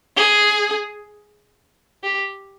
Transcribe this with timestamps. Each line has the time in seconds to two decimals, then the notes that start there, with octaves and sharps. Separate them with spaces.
0.17 G#4
2.03 G4